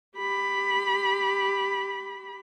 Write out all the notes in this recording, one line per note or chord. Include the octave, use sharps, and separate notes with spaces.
G4 B5